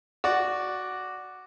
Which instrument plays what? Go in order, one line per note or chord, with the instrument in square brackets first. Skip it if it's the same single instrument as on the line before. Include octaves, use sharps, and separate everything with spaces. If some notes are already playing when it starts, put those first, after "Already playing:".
[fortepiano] F#4 D5